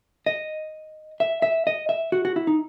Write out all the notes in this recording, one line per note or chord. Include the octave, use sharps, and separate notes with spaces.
D#5
E5
E5
D#5
E5
F#4
F#4
E4
D#4